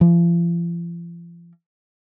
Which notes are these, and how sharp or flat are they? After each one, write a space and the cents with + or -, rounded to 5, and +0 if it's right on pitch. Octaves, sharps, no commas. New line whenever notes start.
F3 -40